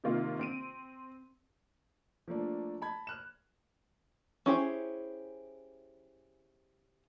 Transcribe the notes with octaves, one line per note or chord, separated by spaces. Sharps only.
C3 D#3 A#3 C4 F4
C4 D7 D#7
F3 A3 A#3 D4
A5 B5 G#6
F6 F#6 E7
C#4 E4 G4 G#4 C5